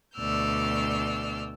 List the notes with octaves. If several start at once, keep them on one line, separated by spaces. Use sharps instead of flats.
D2 B2 D5 E6 F6 G6